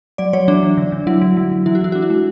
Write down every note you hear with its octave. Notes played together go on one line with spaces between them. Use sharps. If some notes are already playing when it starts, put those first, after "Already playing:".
F#3 D5
F#3 C#5
E3 D4
E3
D3
D3
F#3 E4
F#3
F#3
F#3
E3 E4
F#4
E3 E4
D4 F#4
E4
G#3